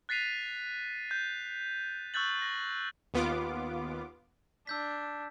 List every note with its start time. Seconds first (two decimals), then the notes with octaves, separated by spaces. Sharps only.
0.09 F#6 A6 B6 C7 D#7 F7
1.11 G6
2.14 C#6 E6 F#6 G6 A6 F#7
2.42 A#6
3.14 D#2 B3 F4 D6
4.67 D4 E6 G6 B6